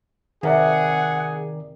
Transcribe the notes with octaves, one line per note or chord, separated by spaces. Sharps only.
C3 D#3 G#4 A#4 D5 F#5